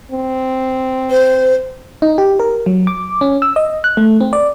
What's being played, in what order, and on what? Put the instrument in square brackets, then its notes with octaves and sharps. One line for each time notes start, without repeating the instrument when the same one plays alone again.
[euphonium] C4
[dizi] C5
[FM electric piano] D#4
G4
A#4
F#3
D6
C#4
E6
D#5
F#6
A3
C4
D5